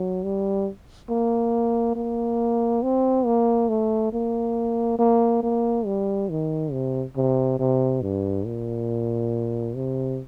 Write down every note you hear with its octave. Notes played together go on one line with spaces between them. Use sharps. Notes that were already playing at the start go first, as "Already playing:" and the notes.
Already playing: F#3
G3
A#3
A#3
C4
A#3
A3
A#3
A#3
A#3
G3
D#3
C3
C3
C3
G2
A#2
C3